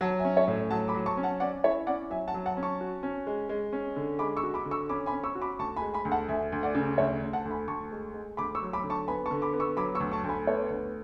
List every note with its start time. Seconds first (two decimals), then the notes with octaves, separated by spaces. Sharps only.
0.01 F#3 F#5 A5
0.19 E5 G#5
0.24 C#4
0.37 C#5 E5
0.48 A2
0.70 F#3 F#5 A5
0.88 B5 D6
0.94 F#3
1.06 A5 C#6
1.17 C#4
1.23 F#5 A5
1.40 C#4 D5 F#5
1.64 E4 C#5 E5
1.87 C#4 D5 F#5
2.10 F#3 E5 G#5
2.28 F#5 A5
2.34 F#3
2.46 F#5 A5
2.57 C#4
2.63 A5 C#6
2.81 F#4
3.03 C#4
3.27 G#3
3.49 G#3
3.73 C#4
3.96 D3
4.19 G#3 B5 D6
4.36 C#6 E6
4.43 F#4
4.54 B5 D6
4.66 D3
4.71 C#6 E6
4.89 C#4 B5 D6
5.06 G#5 B5
5.12 C#4
5.24 C#6 E6
5.35 F#4
5.42 B5 D6
5.59 D2 A5 C#6
5.76 G#5 B5
5.82 G#3
5.94 G#5 B5
6.05 D2
6.11 F#5 A5
6.28 D2 E5 G#5
6.52 D2
6.63 D5 F#5
6.75 C#3
6.98 D2 C#5 E5
7.22 D2
7.33 F#5 A5
7.45 D2
7.51 G#5 B5
7.68 D2 A5 C#6
7.92 G#3
8.14 G#3
8.37 D2 B5 D6
8.55 C#6 E6
8.62 F#3
8.73 B5 D6
8.84 D3
8.90 A5 C#6
9.08 B3 G#5 B5
9.26 A5 C#6
9.31 D3
9.42 B5 D6
9.54 B3
9.60 C#6 E6
9.77 F#3 B5 D6
9.95 C#6 E6
10.00 D2
10.12 A5 C#6
10.24 D2
10.29 G#5 B5
10.47 B3 A4 C#5
10.70 D2